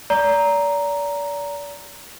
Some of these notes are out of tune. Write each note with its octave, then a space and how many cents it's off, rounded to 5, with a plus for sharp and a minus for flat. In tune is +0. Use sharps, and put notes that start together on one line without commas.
D5 -35 A#5 +0